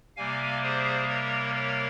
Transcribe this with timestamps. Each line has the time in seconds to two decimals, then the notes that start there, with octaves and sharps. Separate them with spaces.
0.17 C3 G3 A#3 F5 G#5
0.63 G#4 C5
1.09 A#4 C#5
1.55 A#4 C#5